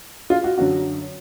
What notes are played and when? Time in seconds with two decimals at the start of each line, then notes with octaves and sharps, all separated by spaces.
0.30 F4
0.44 F#4
0.58 F#2 D3 F#3 F#4